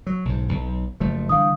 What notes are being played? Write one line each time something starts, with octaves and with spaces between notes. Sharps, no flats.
F#3
B1 G#2
B1
F#1 F3 A3
D3 E3 G3 F5 D#6